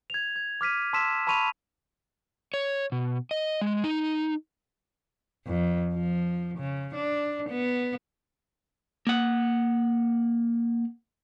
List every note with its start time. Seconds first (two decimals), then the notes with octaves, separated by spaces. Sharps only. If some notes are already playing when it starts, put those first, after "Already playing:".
0.10 G#6 F7
0.36 G#6
0.61 D6 F6 B6 D#7
0.93 A5 C6 E6 B6 E7
1.27 A5 B5 C#6 D#7 F7
2.54 C#5
2.92 B2
3.31 D#5
3.61 G#3
3.84 D#4
5.46 F2
5.94 F3
6.58 C#3
6.95 D4
7.49 B3
9.07 A#3 F#5